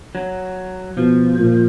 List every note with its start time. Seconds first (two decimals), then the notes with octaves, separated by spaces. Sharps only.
0.15 F#3
0.97 B2 F3
1.38 A#2